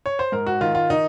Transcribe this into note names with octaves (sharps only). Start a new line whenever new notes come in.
C#5
C5
G#2 A#4
F#4
D#3 F4
F4
D#3 D#4